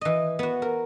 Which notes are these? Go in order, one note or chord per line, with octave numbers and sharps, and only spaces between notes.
E3 D#5
B3 F#4
A#4